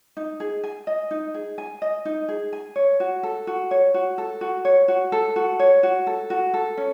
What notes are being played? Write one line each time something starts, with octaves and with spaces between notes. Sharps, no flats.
D#4
G#4
G#5
D#5
D#4
G#4
G#5
D#5
D#4
G#4
G#5
C#5
F#4
A4
F#4
C#5
F#4
A4
F#4
C#5
F#4
A4
F#4
C#5
F#4
A4
F#4
A4
C#4